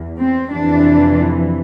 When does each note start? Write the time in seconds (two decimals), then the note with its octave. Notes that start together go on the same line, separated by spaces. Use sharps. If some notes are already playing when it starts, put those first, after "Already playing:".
Already playing: E2
0.19 C4
0.52 F2 C3 E3 D4